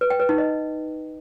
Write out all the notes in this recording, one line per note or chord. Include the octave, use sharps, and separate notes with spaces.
B4
G5
B4
D#4
D#5